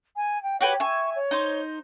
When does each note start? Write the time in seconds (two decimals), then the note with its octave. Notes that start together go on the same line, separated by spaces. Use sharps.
0.16 G#5
0.43 G5
0.61 F#4 G4 B4 C#5
0.80 E5 G#5 C#6
1.16 C#5
1.31 D#4 C5